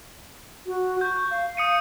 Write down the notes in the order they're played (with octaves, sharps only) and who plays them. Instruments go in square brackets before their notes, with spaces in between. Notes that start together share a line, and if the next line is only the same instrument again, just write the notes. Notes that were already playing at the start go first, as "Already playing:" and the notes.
[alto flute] F#4
[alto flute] C#6 [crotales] G6
[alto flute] F5
[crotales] D#6 C#7 D#7